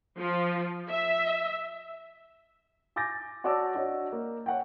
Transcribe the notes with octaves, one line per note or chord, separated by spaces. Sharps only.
F3
E5
G#5 D6 G6 A6 A#6
F#4 C#5 D5 A5 D6 E6
D4 F#4 C#5 D#5
A#3
C#5 F#5 G5